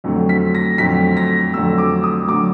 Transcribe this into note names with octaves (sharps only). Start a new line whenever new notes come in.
F2 D3 F#3 A3
B6
A#6
F2 D3 F#3 A3 B6
A#6
F2 D3 F#3 A3 E6
D6
D#6
D3 F#3 A3 D6